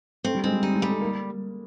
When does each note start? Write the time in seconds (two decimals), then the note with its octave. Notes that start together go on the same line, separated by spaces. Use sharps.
0.24 A3 C4
0.35 G3
0.44 G#3 C4
0.52 G3
0.63 G3 D#4
0.76 G#3
0.82 G3
0.88 A3
1.01 A#3